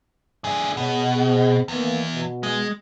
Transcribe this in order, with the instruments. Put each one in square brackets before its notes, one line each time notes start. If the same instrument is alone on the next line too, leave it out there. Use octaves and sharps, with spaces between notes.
[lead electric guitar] D3 G#4
[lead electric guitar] B2 [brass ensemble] G#4 C#5
[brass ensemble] C4 G#4
[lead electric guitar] E2 [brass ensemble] D#3 A#3 B3
[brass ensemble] B2
[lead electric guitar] G#3